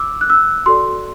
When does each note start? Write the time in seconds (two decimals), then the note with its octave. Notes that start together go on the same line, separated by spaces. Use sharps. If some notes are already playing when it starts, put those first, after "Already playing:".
Already playing: D6 E6
0.21 F#6
0.30 E6
0.66 F#4 A4 D5 C6